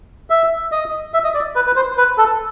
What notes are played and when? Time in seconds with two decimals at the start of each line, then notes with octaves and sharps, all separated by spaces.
0.30 E5
0.72 D#5
1.14 E5
1.24 D#5
1.34 D5
1.55 B4
1.67 B4
1.76 C5
1.98 B4
2.18 A4